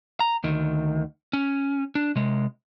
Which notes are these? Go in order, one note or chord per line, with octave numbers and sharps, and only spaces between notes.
A#5
D2 D#3
C#4
D4
C3 G#3